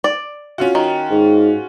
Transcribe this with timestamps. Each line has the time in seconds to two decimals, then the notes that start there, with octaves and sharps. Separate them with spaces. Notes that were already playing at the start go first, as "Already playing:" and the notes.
0.04 D5
0.58 C#4 F4 F#4
0.75 D#3
1.11 G#2